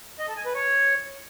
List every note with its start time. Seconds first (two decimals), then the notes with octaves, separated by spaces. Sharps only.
0.19 D#5
0.28 A4
0.37 G#5
0.46 B4
0.54 C#5